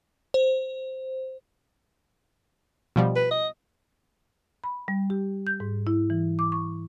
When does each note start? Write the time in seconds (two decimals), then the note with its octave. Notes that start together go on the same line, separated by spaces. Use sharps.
0.34 C5
2.96 B2 F3 G3
3.16 B4
3.31 D#5
4.64 B5
4.88 G3
5.10 G4
5.47 G6
5.60 G#2
5.87 E4
6.10 E3
6.39 D6
6.52 C#6